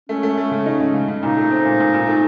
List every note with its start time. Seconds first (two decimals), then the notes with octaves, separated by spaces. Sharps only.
0.09 A3 C#4
0.23 A3
0.37 A3
0.51 C#3
0.66 D#4
0.80 C#3
0.94 C#3
1.08 C#3
1.23 A#2 D#4
1.37 A3
1.51 C4
1.65 A#2
1.79 A#2
1.94 A#2
2.08 A3